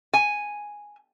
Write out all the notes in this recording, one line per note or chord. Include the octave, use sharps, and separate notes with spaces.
G#5